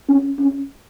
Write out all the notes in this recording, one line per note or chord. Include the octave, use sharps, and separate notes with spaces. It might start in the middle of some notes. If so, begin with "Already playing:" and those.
C#4
C#4